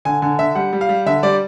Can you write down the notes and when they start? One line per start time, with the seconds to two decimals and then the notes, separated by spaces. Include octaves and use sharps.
0.05 D3 G#5
0.22 D3 G#5
0.39 D3 E5
0.55 G3 F#5
0.73 G3
0.81 F5
0.89 G3
1.06 D3 E5
1.23 G3 D5